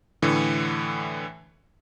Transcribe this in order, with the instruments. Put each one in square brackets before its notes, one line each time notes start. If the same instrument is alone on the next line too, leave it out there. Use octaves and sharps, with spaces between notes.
[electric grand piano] A2 D3 E3